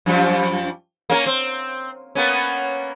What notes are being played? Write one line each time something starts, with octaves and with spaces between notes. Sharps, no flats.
F#2 F3 G3
A#3 C#4 A#4
C4
A#3 B3 C#4